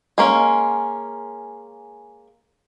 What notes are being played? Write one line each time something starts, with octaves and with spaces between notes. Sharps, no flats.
G#3 A#3 C#4